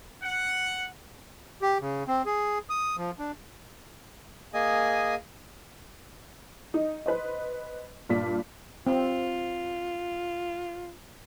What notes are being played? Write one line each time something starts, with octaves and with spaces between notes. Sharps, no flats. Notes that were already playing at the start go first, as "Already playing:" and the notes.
F#5
G4
C#3
C4
G#4
D#6
F3
D4
A#3 G#4 D#5 G#5 D#6
D#4
B4 C5 D#5
G2 A#2 D5 B6
C4 F4